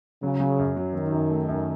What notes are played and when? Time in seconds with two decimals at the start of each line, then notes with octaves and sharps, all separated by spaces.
0.22 C#3 F#3
0.40 F#3
0.59 F#2
0.76 F#3
0.94 D#3 F#3
1.12 F#2
1.30 A3
1.49 F#2